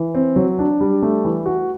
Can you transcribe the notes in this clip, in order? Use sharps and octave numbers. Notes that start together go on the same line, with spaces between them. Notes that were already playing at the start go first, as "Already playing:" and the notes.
Already playing: E3
C4
F#3
D4
G3
A3
E3
F#4